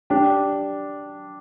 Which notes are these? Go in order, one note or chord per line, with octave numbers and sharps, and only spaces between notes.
D4 G4